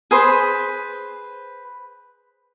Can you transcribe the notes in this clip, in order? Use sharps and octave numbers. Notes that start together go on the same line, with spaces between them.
G#4 B4 C5